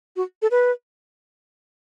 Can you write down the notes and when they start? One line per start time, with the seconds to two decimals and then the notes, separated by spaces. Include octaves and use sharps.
0.16 F#4
0.42 A4
0.51 B4